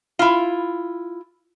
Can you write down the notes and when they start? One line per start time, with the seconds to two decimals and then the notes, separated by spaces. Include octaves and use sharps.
0.19 E4 F4